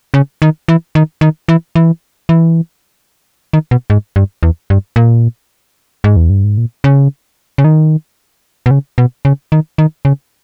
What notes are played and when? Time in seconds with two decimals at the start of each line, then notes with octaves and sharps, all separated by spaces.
0.14 C#3
0.42 D#3
0.68 E3
0.95 D#3
1.21 D#3
1.49 E3
1.76 E3
2.29 E3
3.53 D#3
3.71 B2
3.90 G#2
4.16 G2
4.43 E2
4.70 G2
4.96 A#2
6.04 G#2
6.16 E2
6.30 G2
6.44 G#2
6.58 A#2
6.84 C#3
7.58 C#3
7.64 D#3
8.66 B2
8.71 C#3
8.98 B2
9.25 C#3
9.52 D#3
9.78 D#3
10.05 C#3